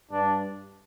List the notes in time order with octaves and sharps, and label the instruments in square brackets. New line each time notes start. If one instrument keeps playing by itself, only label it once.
[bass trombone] G2 [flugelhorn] D4